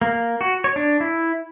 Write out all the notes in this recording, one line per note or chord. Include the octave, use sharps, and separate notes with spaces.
A#3
F#4
C#5
D4
E4